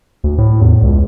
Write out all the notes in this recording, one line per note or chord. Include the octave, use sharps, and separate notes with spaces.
D2
A2
E2
C#2